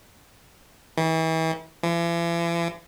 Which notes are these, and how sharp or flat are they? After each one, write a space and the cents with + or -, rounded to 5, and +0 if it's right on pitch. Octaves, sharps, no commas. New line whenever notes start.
E3 -35
E3 +45